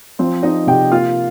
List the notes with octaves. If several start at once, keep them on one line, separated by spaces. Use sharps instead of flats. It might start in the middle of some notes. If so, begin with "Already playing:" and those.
F3 C4 C5
C4 D#4 D#5
C3 G4 G5
A#3 F4 F5